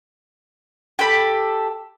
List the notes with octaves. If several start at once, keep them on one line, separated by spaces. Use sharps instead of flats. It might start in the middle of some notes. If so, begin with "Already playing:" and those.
G4 A4 B5